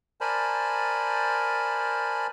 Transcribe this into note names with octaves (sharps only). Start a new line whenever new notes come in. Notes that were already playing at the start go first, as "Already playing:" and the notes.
A#4 C5 D5 G#5 A5 B5